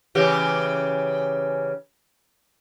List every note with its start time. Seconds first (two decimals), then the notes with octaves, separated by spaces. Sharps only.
0.15 C#3 E3 G4